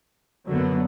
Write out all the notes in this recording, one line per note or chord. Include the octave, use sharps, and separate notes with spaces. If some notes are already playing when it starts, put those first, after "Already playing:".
F#2 D3 F#3 B3